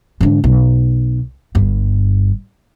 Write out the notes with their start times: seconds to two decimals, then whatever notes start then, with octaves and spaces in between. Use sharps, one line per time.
0.21 G#2 D3
0.44 B1
1.55 G1 G2